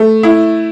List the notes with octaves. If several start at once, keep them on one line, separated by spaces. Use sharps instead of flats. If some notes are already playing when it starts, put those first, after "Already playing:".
Already playing: A3
E4